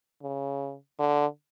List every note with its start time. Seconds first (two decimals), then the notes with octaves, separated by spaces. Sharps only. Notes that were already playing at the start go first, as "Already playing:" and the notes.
0.22 C#3
0.99 D3